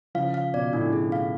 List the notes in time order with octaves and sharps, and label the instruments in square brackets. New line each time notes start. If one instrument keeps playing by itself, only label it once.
[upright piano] C#3 F3 [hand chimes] F5
[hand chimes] F5
[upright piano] B2 [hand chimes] D5
[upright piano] A2 [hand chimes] D4
[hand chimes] G#4
F5